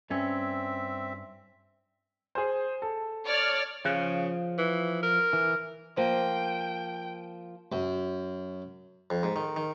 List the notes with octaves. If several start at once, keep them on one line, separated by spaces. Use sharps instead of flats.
G2 C4 C#4 E5
G#4 C5
A4
C#5 D5 F6
C#3 F3 F#6
E3
A#4
E3
F3 A#3 C5 G5
F#2
F2
G#2
D#3
D#3